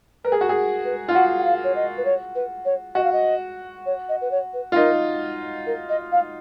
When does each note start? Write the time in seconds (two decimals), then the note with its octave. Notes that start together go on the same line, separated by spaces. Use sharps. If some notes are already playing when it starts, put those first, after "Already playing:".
0.25 A#4 B4
0.32 G#4
0.41 F#4
0.49 G#4
0.85 B4
1.09 F4
1.15 F#4 F#5
1.38 F#5
1.45 F5
1.64 C#5
1.76 D#5
1.97 B4
2.05 C#5
2.36 B4
2.65 C#5
2.95 F#4 D#5
3.04 F5
3.13 D#5
3.86 C#5
4.09 D#5
4.21 B4
4.31 C#5
4.54 B4
4.72 F4
4.76 D#4 A#4
5.67 A#4
5.89 D#5
6.12 F5